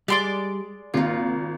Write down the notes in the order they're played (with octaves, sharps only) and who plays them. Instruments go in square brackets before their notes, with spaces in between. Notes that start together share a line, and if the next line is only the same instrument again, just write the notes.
[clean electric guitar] G3 [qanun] G#3 [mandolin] D5 C6 D6
[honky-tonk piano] G#1 [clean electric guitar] C#2 A#3 F5 [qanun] D#4 F4